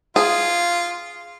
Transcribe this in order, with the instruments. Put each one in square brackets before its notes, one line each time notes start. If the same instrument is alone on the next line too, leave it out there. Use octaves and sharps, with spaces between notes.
[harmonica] F4 [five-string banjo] G#4